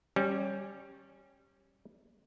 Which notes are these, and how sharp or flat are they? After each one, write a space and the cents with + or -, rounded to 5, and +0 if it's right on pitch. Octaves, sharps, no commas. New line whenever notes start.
G3 +0 C#4 -15